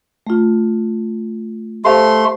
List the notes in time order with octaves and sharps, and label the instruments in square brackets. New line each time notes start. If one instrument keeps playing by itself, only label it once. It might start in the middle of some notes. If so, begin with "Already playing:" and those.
[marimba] A3 F4
[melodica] A3 C6 [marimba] G4 C5 F5